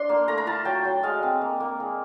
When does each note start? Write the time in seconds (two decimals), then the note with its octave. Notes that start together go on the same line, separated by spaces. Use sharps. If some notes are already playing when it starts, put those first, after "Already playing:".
Already playing: D4 C6
0.09 A#3
0.27 A3 A#5
0.37 A#5
0.46 F4 A5
0.65 F#3 G5
0.85 F#3
1.03 G#3 F5
1.23 C4
1.41 A#3
1.60 A#3
1.80 G#3